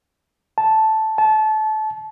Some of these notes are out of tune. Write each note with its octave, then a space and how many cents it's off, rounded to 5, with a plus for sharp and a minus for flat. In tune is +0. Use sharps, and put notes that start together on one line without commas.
A5 -5
A5 -25